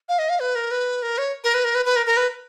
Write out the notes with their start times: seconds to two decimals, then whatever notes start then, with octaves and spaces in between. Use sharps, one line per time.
0.09 F5
0.19 D#5
0.29 F5
0.40 B4
0.55 A#4
0.71 B4
1.02 A#4
1.18 C#5
1.44 A#4
1.54 B4
1.64 A#4
1.75 B4
1.85 B4
1.96 A#4
2.06 A#4
2.17 B4